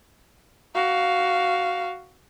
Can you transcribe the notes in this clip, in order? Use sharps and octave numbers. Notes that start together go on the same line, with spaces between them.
F#4 F5